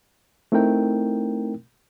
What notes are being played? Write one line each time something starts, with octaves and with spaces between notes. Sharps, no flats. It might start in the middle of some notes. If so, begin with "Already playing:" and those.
A3 C4 D#4 E4 A#4 G5